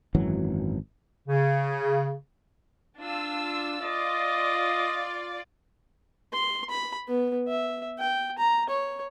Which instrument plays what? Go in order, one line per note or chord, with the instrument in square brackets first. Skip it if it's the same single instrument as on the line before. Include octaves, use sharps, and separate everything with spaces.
[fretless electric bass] G#1 F#2 E3 F#3
[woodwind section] C#3
[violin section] D4 F4 E6
[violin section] F4 D5 [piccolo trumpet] D#5
[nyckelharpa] C6
B5
B3
E5
G5
A#5
C#5